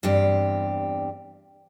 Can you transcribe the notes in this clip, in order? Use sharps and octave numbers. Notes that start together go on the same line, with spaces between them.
E2 G2 C4 G4